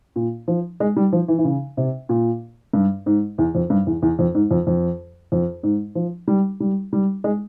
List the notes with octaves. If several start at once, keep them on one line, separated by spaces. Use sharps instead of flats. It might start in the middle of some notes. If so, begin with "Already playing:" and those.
A#2
F3
G#3
G3
F3
E3
E3
C#3
C3
A#2
G2
G#2
E2
F2
G2
E2
E2
F2
G#2
F2
F2
F2
G#2
F3
G3
G3
G3
G#3